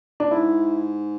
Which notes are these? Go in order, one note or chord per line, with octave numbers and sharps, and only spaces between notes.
D4
G#2 E4